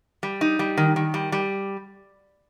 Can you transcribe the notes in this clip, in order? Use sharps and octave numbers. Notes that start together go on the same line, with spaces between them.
G3
D#4
G3
D#3
D#3
G3
G3